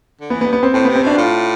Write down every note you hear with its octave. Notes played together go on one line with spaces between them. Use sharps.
D3
E3 B3
B3
G2
B3
C4
A2 C4
C3 B3
C4
B2 D4
A2 F4